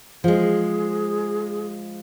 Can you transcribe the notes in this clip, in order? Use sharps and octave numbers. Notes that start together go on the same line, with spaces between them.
F3 G#3 G#4